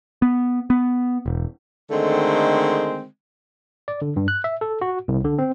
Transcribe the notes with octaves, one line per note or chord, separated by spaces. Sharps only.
B3
B3
E1
D3 D#3 G#3 A3 C4
D5
D3
G2
F#6
E5
A4
F#4
C2
D3
C4